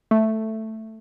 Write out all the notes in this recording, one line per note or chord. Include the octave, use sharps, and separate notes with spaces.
A3